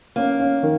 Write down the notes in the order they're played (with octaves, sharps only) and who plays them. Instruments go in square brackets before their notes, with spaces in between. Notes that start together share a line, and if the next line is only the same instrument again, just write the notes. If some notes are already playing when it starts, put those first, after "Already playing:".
[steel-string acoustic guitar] A#3 [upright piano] C#4
[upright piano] C#4
D#3